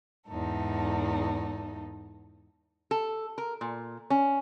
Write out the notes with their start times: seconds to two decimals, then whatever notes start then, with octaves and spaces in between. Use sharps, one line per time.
0.27 E2 G#2 D#4 A4
2.91 A4
3.38 A#4
3.61 A#2
4.10 C#4